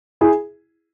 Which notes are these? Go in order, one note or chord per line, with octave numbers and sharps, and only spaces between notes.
E4 G#4